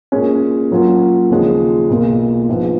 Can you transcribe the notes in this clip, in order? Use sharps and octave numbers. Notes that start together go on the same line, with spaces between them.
A#2 G#3 C#4
A#2 F#3 C#4 F4
D#2 C#3 F3 G#3
B1 A#2 G#3
A#1 G#2 F3 B3